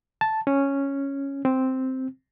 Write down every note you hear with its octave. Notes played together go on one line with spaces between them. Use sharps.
A5
C#4
C4